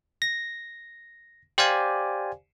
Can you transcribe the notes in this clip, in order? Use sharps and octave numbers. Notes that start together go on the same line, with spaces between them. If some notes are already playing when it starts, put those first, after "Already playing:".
A#6
G4 C5 D5 F5 G#5